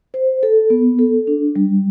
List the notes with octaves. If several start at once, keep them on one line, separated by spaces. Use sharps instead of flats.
C5
A4
B3
A4
D4
G3